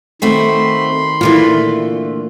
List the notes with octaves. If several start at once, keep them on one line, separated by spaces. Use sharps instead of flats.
D#3 A3 C4 F#4 B5 C6
A#2 D3 E3 A3 F4